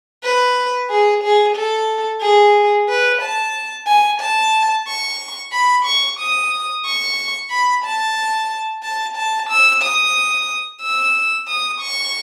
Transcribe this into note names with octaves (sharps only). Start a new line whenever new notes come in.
B4
G#4
G#4
A4
G#4
B4
A5
G#5
A5
C#6
B5
C#6
D#6
C#6
B5
A5
A5
A5
E6
D#6
E6
D#6
C#6